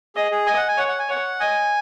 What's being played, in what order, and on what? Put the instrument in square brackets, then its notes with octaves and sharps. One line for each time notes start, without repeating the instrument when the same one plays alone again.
[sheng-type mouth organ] G#4 [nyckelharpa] D#5
[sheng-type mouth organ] G#4
[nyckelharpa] D#5 [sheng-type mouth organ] G#5
[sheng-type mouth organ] F#5
G#5
[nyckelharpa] C#5 [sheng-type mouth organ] F#5
[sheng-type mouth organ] F#5
G#5
[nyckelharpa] C#5 [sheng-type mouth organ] F#5
[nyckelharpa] D#5 [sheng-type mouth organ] G#5